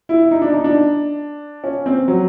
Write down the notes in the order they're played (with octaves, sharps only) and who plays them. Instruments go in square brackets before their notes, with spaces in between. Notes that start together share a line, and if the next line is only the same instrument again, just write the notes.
[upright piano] E4
D#4
D4
D#4
D4
C#4
C4
F#3